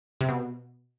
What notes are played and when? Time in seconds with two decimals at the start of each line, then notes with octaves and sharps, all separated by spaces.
0.21 C3
0.29 B2